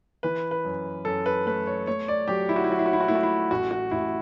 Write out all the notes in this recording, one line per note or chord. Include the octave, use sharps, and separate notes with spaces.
E3 B4
B4
F#2
F#2 A4
B4
A3 B4
C#5
A3 C#5
D5
F#3 G4
E4
F#4
E4
F#3 F#4
E4
F#4
E4
F#4
A3 E4
F#4
E4
A1 F#4
F#4
A1 E4